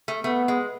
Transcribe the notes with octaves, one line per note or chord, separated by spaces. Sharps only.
A3
A3 B3
G#3